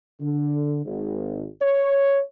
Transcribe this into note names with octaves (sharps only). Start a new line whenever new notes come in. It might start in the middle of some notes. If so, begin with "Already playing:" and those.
D3
G#1
C#5